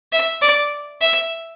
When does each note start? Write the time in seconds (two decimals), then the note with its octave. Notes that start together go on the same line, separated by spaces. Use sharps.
0.13 E5
0.42 D5
1.01 E5